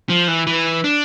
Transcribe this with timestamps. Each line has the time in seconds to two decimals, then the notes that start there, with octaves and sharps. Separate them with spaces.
0.10 F3
0.28 E3
0.47 E3
0.84 D4